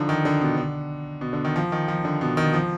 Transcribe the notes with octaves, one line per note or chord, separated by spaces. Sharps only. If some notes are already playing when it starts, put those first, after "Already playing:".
Already playing: D3 F3 D#4
D#3
D3
B2
D3
B2
D3
D#3
F3
D#3
F3
D3
B2
D#3
F3